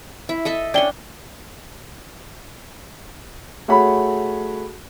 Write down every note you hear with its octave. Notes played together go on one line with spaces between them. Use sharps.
E4
A4 D#5 E5
C#4 D4 D5 G5 G7
A3 F#4 G#4 C#5 B5